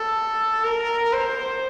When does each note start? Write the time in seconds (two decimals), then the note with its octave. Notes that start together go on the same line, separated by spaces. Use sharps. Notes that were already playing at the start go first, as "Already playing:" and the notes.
Already playing: A4
0.65 A#4
1.13 C5